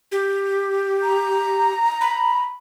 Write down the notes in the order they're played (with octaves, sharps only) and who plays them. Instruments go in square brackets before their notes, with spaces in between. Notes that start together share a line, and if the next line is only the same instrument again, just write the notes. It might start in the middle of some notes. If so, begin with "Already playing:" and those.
[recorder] G4
[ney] A#5
[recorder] B5